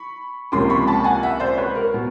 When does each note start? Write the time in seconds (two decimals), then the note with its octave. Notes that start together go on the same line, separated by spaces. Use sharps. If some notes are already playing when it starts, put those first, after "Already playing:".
Already playing: B5 C#6
0.52 C#2 C3 F3 A#3 C#4 C6 D6
0.70 B5 C#6
0.87 A5 B5
1.04 F#5 G#5
1.23 E5 F#5
1.40 C5 D5
1.57 B4 C#5
1.75 A#4
1.94 B2